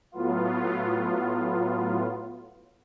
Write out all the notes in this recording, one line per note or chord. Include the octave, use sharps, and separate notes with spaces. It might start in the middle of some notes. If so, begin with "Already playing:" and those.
A2 F#3 B3 F4